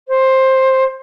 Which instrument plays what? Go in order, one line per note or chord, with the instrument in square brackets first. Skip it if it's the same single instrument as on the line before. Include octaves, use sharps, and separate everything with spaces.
[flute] C5